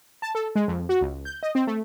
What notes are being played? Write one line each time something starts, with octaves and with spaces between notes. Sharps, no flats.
A5
A4
G#3
F2
F#4
C#2
G6
D#5
C4
A3